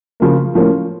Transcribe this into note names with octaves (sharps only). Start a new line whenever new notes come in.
C#3 F3 A#3
A2 F3 A#3 C#4